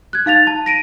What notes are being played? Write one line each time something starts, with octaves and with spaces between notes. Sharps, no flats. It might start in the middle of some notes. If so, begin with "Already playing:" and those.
F#6 G#6
D#4 F5 A6 F7
A5
A#6 D7 D#7